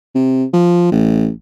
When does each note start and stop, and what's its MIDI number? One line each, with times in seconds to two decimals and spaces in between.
0.15 0.44 48
0.53 0.89 53
0.91 1.29 33